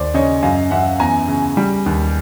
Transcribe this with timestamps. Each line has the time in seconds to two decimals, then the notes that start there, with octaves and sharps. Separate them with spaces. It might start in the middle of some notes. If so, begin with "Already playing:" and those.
Already playing: D#2 C5 D5
0.14 C#3 C#5 D#5
0.43 F#2 D#5 F5
0.71 F#2 E5 F#5
1.00 E2 G#5 A#5
1.28 C#3
1.57 G3
1.86 D#2